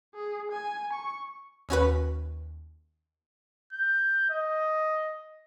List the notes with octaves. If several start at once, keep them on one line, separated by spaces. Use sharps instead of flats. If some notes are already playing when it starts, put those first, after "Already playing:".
G#4
G#5
C#6
D#2 C#4 F#4 B4
G6
D#5